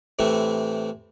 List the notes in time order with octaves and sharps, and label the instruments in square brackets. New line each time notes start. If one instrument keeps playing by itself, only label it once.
[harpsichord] A2 C3 E3 A3